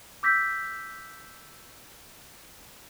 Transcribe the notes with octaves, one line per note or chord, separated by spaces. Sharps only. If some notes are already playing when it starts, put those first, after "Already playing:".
D6 E6 G6 A#6 B6